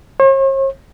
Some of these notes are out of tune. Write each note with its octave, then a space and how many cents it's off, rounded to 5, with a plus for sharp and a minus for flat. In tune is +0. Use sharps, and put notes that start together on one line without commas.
C#5 -45